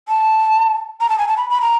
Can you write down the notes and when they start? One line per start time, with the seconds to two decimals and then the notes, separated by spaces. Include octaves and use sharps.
0.09 A5
1.01 A#5
1.09 A5
1.18 G#5
1.28 A5
1.37 B5
1.50 B5
1.61 A#5